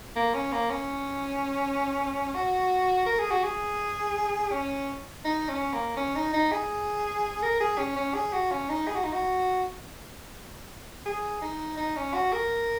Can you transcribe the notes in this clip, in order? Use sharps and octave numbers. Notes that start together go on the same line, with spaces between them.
A#3
C#4
A#3
C#4
F#4
A#4
G#4
F#4
G#4
C#4
D#4
C#4
A#3
C#4
D#4
D#4
G#4
A#4
G#4
C#4
C#4
G#4
F#4
C#4
D#4
G#4
F#4
D#4
F#4
G#4
D#4
D#4
C#4
F#4
A#4